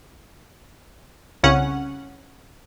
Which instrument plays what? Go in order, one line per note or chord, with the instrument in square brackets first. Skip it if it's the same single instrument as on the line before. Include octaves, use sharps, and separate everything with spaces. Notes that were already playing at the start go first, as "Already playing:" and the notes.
[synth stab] C2 C#3 C#4 F#5